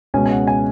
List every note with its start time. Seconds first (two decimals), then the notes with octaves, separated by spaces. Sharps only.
0.14 C#2 B2 G#3 C#4 G#5
0.26 G#5
0.31 F#5
0.47 G#5